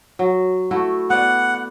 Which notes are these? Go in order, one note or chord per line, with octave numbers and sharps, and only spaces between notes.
F#3
A3 E4 F#4
B3 D5 F#5